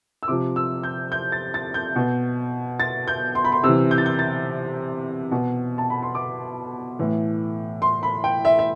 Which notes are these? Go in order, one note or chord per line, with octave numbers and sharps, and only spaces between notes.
E6
C3 F3 D6
E6
G6
G6
A6
A6
G6
B2
A6
G6
C6
B5
C6
C3 E3 E6
G6
A6
G6
A6
B2
A5
B5
C6
D6
A2 E3
C6
B5
G5
E5
E5